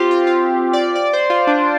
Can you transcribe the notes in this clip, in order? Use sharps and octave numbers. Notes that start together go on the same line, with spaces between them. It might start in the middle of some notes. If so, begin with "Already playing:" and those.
Already playing: C4 F4 G4
F4
F4
D5
D5
C5
F4
D4